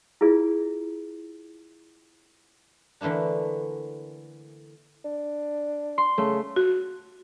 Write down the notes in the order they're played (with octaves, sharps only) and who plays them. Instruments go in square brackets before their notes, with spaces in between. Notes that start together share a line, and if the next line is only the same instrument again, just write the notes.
[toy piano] E4 F4 G#4 D5
[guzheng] D3 E3 A3 A#3 D4
[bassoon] D4
[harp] C6
[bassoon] C#3 [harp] A3
[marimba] F#4